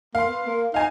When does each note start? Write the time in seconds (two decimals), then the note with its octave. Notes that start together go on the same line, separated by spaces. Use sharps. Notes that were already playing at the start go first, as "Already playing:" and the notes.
0.15 A#3 F5 C6
0.26 B3
0.47 A#3
0.74 D#4 F5 G#5